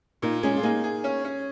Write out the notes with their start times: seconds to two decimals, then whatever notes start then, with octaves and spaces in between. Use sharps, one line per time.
0.22 A#2 A#3 D#4
0.43 G#3 C#4 G#4
0.56 F4
0.63 A#3 D#4 G#4
0.84 G#4
1.04 C#4
1.24 C#4